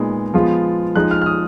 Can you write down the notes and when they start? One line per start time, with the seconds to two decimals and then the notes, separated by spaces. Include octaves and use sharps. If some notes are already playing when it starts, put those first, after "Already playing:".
Already playing: A#2 G#3 B3 D#4
0.34 F3 G#3 B3 F4
0.96 F3 G#3 D#4 F#6
1.11 F6
1.22 F6
1.26 D#6